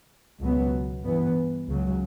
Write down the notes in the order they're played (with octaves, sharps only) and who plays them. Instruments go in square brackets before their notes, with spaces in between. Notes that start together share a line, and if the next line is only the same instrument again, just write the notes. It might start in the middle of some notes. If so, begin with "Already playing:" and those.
[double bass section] C#2 B2 F#3 B3
G2 E3 B3
C#2 C#3 F#3